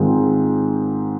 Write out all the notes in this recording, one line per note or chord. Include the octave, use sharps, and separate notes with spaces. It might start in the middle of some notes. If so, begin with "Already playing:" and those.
Already playing: G#2 D#3 G#3 C4 F4